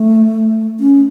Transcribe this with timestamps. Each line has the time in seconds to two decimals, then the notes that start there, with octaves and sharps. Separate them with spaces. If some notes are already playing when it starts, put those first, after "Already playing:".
Already playing: A3
0.80 C#4